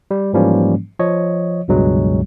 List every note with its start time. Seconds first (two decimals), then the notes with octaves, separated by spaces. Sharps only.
0.11 G3
0.33 G#2 E3 F3 G3 A#3 C#4
0.99 F3 C#5 D#5
1.68 C#2 G2 B2 F#3 G#3